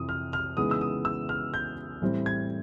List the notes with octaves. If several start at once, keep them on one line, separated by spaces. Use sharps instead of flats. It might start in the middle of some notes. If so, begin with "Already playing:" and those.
Already playing: F2 C3 E3 D#6
F6
F6
C#3 E3 G#3 B3 D#4 D#6
E6
D#6
E6
F6
G6
A2 E3 G3 C4
G#6